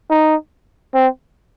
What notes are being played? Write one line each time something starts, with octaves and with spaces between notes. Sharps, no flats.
D#4
C4